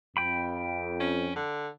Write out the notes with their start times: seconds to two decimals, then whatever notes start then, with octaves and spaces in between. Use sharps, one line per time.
0.17 F2 G5 B5
1.00 C#4
1.36 D3